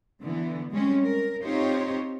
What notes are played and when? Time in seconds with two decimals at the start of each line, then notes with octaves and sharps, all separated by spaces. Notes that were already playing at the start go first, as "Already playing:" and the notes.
0.22 D3 E3 B3
0.72 G3 G#3 C4 C#4
1.05 A#4
1.43 C4 D#4 F4 G4 C5 C#5